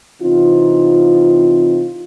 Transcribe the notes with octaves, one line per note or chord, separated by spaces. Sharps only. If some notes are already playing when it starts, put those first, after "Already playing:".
C3 E3 C4 D#4 F4